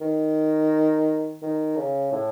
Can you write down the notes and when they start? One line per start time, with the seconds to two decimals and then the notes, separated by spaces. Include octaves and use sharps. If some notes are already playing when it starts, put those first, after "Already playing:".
0.01 D#3
1.42 D#3
1.76 C#3
2.12 A2